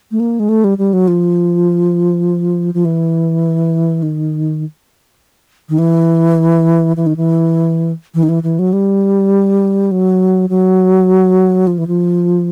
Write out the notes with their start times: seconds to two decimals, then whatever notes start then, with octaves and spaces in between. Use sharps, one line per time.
0.11 A3
0.20 A#3
0.40 G#3
0.49 A3
0.64 G3
0.78 G3
0.93 F#3
1.08 F3
2.74 F3
2.85 E3
4.03 D#3
5.69 D#3
5.78 E3
6.97 E3
7.06 D#3
7.17 E3
8.15 E3
8.23 D#3
8.29 E3
8.43 E3
8.59 F#3
8.73 G3
9.91 F#3
10.49 F#3
11.67 F3
11.78 E3
11.87 F3